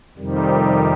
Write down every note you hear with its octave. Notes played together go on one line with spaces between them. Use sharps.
F2 C3 D#3 G3